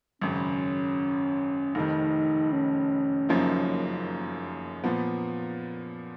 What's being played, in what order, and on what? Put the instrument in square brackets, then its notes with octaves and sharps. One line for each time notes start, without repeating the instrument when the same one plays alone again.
[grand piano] G#1 F#2 C#3 [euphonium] C#4
[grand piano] F1 F2 D#3 [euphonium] D#4
[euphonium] C#4
[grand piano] F#1 F#2 F3 A#3 D#4
A#2 F3 B3